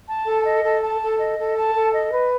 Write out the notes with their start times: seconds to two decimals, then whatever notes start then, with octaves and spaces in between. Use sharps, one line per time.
0.09 A5
0.28 A4
0.45 D#5
0.64 A4
0.82 A5
1.01 A4
1.19 D#5
1.38 A4
1.56 A5
1.74 A4
1.93 D#5
2.11 B4